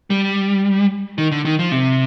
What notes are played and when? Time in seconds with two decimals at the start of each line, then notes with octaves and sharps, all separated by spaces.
0.10 G3
1.18 D#3
1.32 D3
1.45 D#3
1.59 F3
1.72 C3